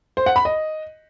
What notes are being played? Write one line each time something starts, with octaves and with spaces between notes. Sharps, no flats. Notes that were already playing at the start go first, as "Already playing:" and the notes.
C5
F#5
B5
D#5